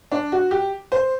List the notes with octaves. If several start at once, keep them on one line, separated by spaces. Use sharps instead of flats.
D4
F#4
G4
C5